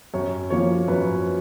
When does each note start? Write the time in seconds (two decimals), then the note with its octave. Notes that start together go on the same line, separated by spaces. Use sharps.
0.14 F#2 C#5
0.50 F3 A#3 C#5
0.88 F#2 B4